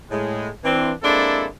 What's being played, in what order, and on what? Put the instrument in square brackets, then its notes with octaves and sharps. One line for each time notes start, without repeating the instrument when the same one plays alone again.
[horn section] A2 G#3
E3 C4 D4
G#3 A#3 C4 D4 E4 A4